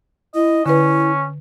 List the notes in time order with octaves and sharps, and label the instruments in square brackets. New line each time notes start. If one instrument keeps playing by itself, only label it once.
[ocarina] E4 [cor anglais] D#5
[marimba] D3 B4 [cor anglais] C#4 [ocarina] E4